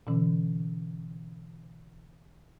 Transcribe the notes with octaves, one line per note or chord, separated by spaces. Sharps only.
B2 D3 E3 C#4